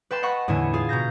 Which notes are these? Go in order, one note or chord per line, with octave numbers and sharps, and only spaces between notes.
B4 G5 A5 C6
D#5 F#5 B5 C#6
E2 A2 D3 E4 G#5
F4 G#4
B2 A#5 G6 A#6